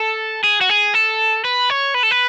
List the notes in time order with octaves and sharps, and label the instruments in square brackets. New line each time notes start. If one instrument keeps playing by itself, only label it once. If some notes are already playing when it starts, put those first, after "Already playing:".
Already playing: [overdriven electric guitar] A4
G#4
F#4
G#4
A4
B4
C#5
B4
A4
B4